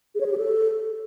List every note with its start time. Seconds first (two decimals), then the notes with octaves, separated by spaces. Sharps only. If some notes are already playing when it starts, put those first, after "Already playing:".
0.15 G#4
0.21 C#5
0.26 G#4
0.32 G4
0.38 A4